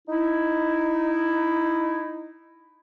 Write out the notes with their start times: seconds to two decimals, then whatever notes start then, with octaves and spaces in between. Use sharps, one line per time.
0.08 D#4 E4